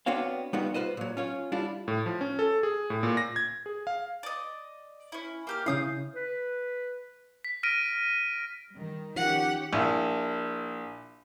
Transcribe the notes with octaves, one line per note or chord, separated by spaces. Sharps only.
B3 C4 D4 F#4 C#5 F5
G3 B3 D#4 F4 F#4 B4
F4 B4 C5 D#5
A#2 F#3
C#4 F4 C#5
G3 D4 E4 F4
A2
F3
C#4
A4
G#4
A2
A#2
A#6
G#6
G#4
F5
D5 D#5
C#4 E4
A#3 G4 F6
C#3 C#4 E4 F5 D#6 G6
B4
B6
F6 A#6 B6 D7 D#7
D#3 G3
D#3 F3 C#4 G4 F#5
A#1 E4